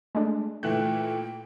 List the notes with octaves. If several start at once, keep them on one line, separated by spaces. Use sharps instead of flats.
G#3 A3 D4
A#2 E3 A3 G5 F#6